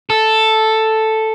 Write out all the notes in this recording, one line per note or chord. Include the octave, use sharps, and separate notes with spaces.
A4